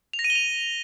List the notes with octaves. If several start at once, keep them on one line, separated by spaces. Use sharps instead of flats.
F7
A#6
D#7
G7
F7